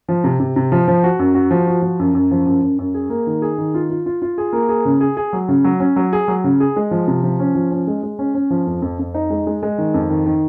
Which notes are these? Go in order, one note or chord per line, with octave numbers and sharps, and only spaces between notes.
F3
C3
C3
C3
F3
F3
F#4
F#2
F#4
F3
F#4
F3
F#2
F#2
F3
F#2
F#2
F#2
G#4
A#3
D#3
G#4
D#3
F4
F4
F4
F4
G#4
A#3
G#4
C#3
G#4
G#4
F#3
C#3
F#3
C#4
F#3
G#4
F#3
C#3
G#4
G#3
F3
C3
F3
C#4
F3
C#4
G#3
G#3
C#4
C#4
F3
F2
F2
F2
D#4
G#3
G#3
G#3
D#3
F2
D#3
D#3